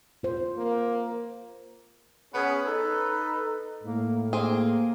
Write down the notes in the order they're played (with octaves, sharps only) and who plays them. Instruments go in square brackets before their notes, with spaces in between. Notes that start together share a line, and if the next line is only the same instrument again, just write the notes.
[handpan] F4 C5
[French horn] A#3
[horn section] B3 C#4 G#4
D#4 A4 B4
[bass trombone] A2 [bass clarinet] A#3
[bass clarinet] A#3 [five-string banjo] C4 G#4